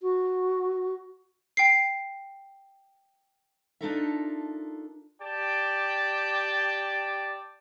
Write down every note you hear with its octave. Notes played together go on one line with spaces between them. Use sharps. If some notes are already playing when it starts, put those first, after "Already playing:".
F#4
G5 C7
D4 D#4 F4 A4 A#4 E5
G4 D5 G5 A5